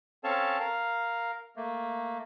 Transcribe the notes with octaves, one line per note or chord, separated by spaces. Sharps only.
C4 C#4 A4 C#5 F5 A5
A#4 F5
A3 A#3